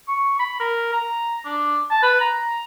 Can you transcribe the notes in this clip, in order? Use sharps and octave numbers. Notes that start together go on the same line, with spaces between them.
C#6
B5
A#4
A#5
D4
A5
B4
A#5